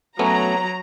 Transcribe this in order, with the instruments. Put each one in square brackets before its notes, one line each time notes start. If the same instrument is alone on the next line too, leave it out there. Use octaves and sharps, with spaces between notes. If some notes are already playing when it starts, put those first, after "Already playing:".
[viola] F#3 [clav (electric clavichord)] A3 B3 C#4 [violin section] A#5